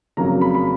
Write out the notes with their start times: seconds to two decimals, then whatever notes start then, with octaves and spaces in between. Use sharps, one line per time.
0.17 F1 F2 C#3 F#3 A#3 A#5
0.41 B5
0.55 B5